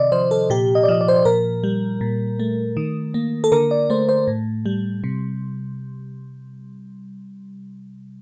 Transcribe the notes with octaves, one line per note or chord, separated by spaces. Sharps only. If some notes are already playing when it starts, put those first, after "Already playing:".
Already playing: C3 D#3 D5 D#5
F3 C5
A4
A#2 G4
D#5
D5
F3 D#5
D5
C5
D5
A#2 A#4
G3
A#2
A3
D#3
A#3
A4
D3 A#4
D5
A3 C5
C5
A2
G3
C3